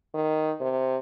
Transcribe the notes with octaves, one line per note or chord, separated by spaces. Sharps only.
D#3
C3